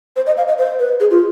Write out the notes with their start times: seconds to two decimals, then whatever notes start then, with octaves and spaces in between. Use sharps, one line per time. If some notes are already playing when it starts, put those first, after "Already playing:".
0.16 C5
0.26 D#5
0.37 F5
0.48 D#5
0.58 C5
0.79 B4
1.00 G#4
1.11 F4